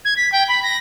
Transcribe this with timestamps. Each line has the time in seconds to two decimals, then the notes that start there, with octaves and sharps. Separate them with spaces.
0.05 G#6
0.17 B6
0.32 G5
0.48 B5
0.63 A#6